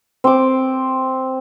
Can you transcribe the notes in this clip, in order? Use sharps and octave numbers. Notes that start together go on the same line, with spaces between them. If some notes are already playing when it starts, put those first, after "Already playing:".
C4 D6